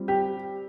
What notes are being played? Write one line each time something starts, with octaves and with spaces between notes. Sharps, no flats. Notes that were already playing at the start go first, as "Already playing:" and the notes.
Already playing: G3 C4 F4
G4